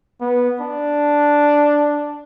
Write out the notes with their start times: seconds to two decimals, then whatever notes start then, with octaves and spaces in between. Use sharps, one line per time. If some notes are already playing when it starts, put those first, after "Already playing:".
0.21 B3
0.61 D4